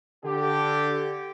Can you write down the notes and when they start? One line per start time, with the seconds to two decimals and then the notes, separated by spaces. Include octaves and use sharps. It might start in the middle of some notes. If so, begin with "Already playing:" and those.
0.24 D3 G4